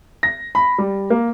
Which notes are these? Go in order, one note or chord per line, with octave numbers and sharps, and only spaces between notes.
A#6
B5
G3
A#3